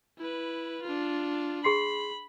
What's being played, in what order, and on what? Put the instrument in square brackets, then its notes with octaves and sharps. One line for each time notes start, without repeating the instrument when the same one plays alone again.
[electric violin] E4 B4
D4 F4
[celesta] G#4 C6 C7 [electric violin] B5